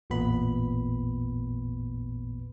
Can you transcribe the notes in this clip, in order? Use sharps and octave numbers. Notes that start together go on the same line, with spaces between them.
A1 E2 A#2 B3 B5